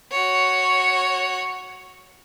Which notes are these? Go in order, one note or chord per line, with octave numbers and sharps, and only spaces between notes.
F#4 C#5